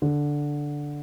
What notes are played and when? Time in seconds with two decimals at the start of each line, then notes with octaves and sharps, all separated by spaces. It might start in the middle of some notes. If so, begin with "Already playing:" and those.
0.02 D3